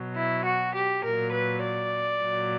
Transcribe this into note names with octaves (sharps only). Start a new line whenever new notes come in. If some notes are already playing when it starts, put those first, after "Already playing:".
Already playing: B2 F#3
E4
F#4
G4
A#2 F#3 A#4
B4
D5
A#2 F#3